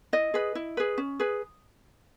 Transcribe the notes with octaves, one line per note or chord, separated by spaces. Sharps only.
E4 D#5
G#4 B4
E4
G#4 B4
C#4
G#4 B4